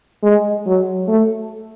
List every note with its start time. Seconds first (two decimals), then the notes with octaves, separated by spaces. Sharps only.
0.23 G#3
0.66 F#3
1.08 A3